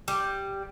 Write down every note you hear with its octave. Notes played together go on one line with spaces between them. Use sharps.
G3